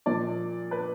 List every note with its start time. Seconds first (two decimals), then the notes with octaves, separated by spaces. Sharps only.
0.06 A#2 F3 D5
0.71 B4